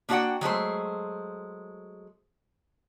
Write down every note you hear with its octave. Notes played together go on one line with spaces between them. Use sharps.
A#3 D4 F#4 D5 F#5 G5
F#3 G#3 A3 C5